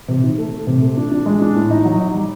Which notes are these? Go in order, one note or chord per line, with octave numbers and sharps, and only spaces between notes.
C3
D#3
A3
A3
C3
A3
D4
D4
G#3
D4
A2
D#4
F#3
D#4
G3